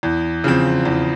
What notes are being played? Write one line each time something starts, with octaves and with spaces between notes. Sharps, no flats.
E2
C#3 F3 C4
E2